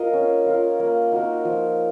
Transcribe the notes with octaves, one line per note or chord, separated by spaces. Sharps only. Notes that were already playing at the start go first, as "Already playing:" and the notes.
Already playing: A#3 F4 A#4 D#5
C#4
F4 A#4
A#3
D#4 F#4 A#4
F3